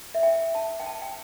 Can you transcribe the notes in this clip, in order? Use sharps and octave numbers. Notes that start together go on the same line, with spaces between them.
E5
G5
A5
G5
A5
G5